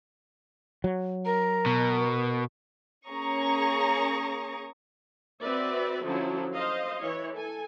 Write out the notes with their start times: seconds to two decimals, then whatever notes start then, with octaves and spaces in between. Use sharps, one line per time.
0.84 F#3
1.25 A#4 A#5
1.66 B2
3.07 A#3 C#4 G#4 A#5 C#6 D#6
5.42 C4 F#4 B4 D5 E5
6.04 D3 F3 F#3 C#4 E4
6.53 C5 D#5 F5
7.01 E3 C#5
7.34 A4 G#5